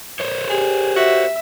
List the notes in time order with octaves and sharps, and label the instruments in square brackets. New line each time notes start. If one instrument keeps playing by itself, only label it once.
[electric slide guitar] A#4 C5 C#5
[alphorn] G4 [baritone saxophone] G#4
[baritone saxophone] F#4 [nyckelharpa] E5